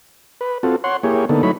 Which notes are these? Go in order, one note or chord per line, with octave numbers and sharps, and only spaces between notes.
B4
C4 F4 F#4 A4
C#5 F#5 C6
A#3 E4 G4 G#4 C#5
D3 A#3 B3 D#4 A4
F#3 A3 D#4 E4 C#5 B5